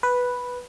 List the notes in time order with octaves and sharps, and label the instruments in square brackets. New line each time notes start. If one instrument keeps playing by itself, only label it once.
[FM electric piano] B4